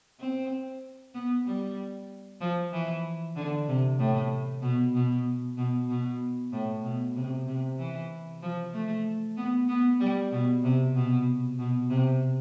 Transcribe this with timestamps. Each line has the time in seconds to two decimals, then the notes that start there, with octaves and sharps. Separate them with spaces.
0.20 C4
1.14 B3
1.46 G3
2.41 F3
2.72 E3
3.36 D3
3.68 C3
3.99 A2
4.62 B2
4.94 B2
5.57 B2
5.89 B2
6.52 A2
6.84 B2
7.16 C3
7.47 C3
7.79 E3
8.42 F3
8.74 A3
9.37 B3
9.69 B3
10.00 G3
10.32 B2
10.64 C3
10.95 B2
11.59 B2
11.90 C3